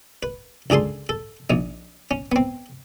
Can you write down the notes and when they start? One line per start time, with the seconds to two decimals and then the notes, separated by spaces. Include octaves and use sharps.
0.23 B4
0.70 C#2 D3 G#4 A4 C6
1.09 A4
1.50 A#1 D#4
2.11 C#4
2.32 B3 C4